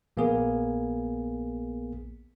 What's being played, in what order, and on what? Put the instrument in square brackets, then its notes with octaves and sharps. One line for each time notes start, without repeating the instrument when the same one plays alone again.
[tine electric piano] A#1 A#3 B3 G#4